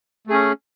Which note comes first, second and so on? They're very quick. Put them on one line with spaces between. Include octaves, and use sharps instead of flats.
A3 G#4 C#4